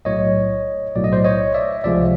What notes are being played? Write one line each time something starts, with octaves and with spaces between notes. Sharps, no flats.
B1 A2 F#3 C#5 D#5
B1 A2 F#3 D5
D#5
C5 D5
C#5 D#5
D5 E5
C#2 C3 F3 G#3 D5 E5